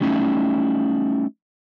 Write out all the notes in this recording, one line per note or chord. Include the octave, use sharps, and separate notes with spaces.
G3 A3 C#4 D#4 E4